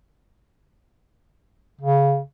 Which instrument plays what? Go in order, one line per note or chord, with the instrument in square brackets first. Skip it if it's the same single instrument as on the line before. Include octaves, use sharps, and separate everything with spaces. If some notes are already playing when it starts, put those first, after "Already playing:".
[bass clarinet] C#3